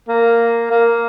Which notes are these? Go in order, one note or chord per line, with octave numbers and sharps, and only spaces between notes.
A#3
A#3